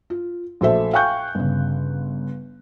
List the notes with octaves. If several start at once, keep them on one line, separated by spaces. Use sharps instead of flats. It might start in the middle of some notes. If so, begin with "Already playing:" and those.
F4
A#1 A3 F#4 A4 C5 E5
F5 G5 G#5 C#6 F#6 G6
G1 C#3